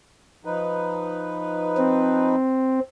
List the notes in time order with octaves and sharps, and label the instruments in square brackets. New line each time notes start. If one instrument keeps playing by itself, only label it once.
[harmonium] F3 D#4 B4
[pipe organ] C4